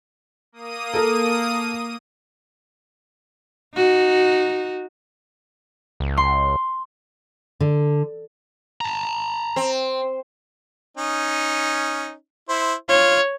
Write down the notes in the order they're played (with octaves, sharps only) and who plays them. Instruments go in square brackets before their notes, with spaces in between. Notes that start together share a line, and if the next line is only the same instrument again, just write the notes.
[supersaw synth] A#3 D#6 D#7
[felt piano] A4 A#4
[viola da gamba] D#4 F#4
[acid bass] C#2
[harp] C6
[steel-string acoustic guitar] D3
[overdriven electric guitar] A5 A#5
[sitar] C4
[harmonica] C#4 D#4
E4 C5
[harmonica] F4 [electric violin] C#5